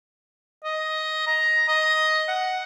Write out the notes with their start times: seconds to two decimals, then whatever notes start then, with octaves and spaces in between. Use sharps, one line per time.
0.64 D#5
1.27 A#5
1.68 D#5
2.28 F#5